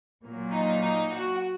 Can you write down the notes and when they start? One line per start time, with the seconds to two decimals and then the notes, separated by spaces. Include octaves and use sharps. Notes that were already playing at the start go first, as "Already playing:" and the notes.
0.23 A#2 F#3 A#3
0.52 D#4
0.82 D#4
1.12 F#4